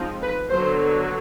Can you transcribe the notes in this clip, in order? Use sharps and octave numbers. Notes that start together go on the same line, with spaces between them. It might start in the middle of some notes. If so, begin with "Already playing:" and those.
Already playing: F3 G#3 C4 D#4
B4
D3 F#3 B3 C5